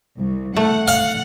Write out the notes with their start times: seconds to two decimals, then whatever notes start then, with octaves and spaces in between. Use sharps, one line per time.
0.16 C2
0.57 A3 F#5
0.88 F5 F#5